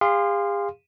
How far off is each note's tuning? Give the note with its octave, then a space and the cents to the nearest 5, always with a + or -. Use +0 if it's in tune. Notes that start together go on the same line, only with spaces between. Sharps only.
G#4 -45 F5 +0 C6 -10